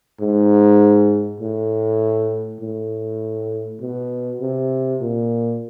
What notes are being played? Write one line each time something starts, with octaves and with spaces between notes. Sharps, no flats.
G#2
A2
A2
B2
C3
A#2